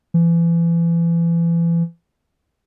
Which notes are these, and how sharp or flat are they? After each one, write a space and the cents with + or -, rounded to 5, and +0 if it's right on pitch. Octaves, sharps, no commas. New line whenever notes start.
E3 +35